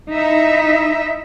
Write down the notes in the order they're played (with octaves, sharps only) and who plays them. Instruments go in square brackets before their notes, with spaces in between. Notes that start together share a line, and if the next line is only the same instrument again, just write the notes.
[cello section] D#4 E4 D#5 E5